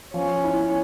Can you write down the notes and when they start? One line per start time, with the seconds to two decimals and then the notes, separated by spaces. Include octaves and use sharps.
0.14 F3 C#4
0.44 E4